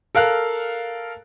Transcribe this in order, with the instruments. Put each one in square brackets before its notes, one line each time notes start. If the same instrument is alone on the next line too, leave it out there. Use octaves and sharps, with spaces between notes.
[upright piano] A4 A#4 F5 F#6